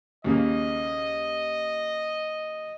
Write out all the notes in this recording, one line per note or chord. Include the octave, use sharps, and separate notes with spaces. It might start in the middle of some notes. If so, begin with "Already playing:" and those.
D#2 C#3 A#3 D#5